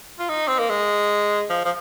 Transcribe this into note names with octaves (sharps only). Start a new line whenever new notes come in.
F4
D#4
C4
A#3
G#3
F3
F3